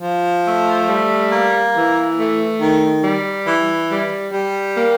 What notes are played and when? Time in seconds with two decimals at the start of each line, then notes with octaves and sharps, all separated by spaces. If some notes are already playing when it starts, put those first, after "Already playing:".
0.01 F3
0.44 A3
0.87 G3
1.30 A#3
1.74 E3
2.17 A3
2.61 D#3
3.04 G3
3.47 E3
3.90 G3
4.33 G3
4.76 A#3